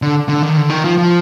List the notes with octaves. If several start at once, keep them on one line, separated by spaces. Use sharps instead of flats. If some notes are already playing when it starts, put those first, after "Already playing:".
D3
D3
D#3
D3
D#3
F3
F3